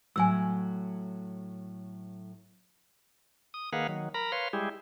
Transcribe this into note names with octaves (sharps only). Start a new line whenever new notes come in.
A2 F#3 G#5 E6
D#6
D#3 A#3 G#4 B4 F5 F#5
D#3 F#3
A#4 A#5 B5
B4 C#5 F5 C6
G3 G#3 E4 G4 G#4